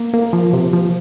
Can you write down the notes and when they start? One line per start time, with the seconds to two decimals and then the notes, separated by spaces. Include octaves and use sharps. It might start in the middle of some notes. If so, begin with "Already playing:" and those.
Already playing: A#3
0.14 A#3
0.33 F3
0.53 C3
0.73 F3